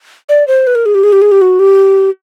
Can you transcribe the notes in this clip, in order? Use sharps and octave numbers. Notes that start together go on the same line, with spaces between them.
D5
C5
B4
A#4
G#4
G4
G#4
G4
G#4
G4
F#4
G4